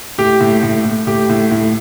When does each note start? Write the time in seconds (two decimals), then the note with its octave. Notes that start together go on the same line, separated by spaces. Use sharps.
0.18 A2 G4
0.40 A2
0.63 A2
0.85 A2
1.07 A2 G4
1.29 A2
1.51 A2